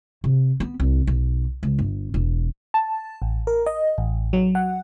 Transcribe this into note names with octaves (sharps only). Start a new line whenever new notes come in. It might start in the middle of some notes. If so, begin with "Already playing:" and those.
C3
B3
C2
B1
C#2
G1
E1
A5
A1
A#4
D#5
A1
F#3
F#5